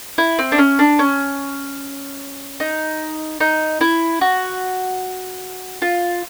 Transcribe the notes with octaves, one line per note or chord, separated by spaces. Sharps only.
E4
C4
D4
C#4
D4
C#4
D#4
D#4
E4
F#4
F4